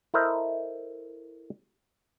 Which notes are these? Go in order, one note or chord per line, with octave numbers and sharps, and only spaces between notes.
E4 A4 A#4 C5 D#5 E5